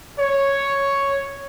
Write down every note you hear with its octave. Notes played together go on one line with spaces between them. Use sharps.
C#5